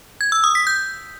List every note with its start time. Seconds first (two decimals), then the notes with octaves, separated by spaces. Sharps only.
0.21 G#6
0.32 E6
0.44 D#6
0.55 B6
0.67 G6